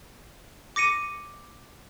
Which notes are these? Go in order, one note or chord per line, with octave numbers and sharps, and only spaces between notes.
D6 A#6 C#7 D#7